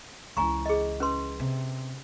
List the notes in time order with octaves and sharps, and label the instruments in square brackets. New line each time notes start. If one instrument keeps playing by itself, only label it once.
[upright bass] C#2 E3 [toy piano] G#5 A#5 C#6
[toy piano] G#4 D#5
C#4 B4 C6
[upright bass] C3